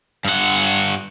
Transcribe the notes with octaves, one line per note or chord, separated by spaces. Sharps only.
G2 F#5